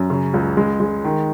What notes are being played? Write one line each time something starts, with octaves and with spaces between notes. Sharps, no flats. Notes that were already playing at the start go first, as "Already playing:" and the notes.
Already playing: F#2
C#3
C#2
G#3
G#3
D#3